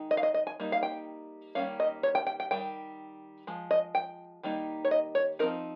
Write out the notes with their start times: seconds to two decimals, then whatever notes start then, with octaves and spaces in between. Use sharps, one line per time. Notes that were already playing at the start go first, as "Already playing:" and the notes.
Already playing: D#3 G#3 D#4
0.11 D#5
0.17 F5
0.23 D#5
0.34 D#5
0.47 G#5
0.60 G3 A#3 D#4
0.72 F5
0.83 G5
1.55 D#3 G3 A#3 C#4 F5
1.80 D#5
2.03 C#5
2.15 G5
2.27 G5
2.40 G5
2.51 D#3 G3 G5
3.47 F3 G#3
3.71 D#5
3.95 G5
4.43 D#3 G3 A#3 D#4
4.85 C#5
4.91 D#5
5.15 C#5
5.39 F3 C4 D#4 A#4